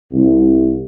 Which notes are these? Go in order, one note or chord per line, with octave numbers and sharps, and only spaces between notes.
C2